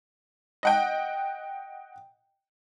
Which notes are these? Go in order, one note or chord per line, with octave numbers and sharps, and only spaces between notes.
D#5 F#5 G5